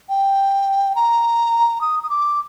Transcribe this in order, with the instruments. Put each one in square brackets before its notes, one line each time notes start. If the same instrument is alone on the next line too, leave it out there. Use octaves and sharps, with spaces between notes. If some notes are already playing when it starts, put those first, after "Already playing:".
[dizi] G5
A#5
D#6
D#6
D6